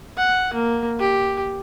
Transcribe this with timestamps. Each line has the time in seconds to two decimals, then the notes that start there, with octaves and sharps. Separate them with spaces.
0.17 F#5
0.53 A#3
1.00 G4